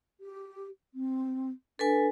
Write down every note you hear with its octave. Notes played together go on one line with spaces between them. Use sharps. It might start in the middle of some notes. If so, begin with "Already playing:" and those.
G4
C4
D4 A4 B4 G#5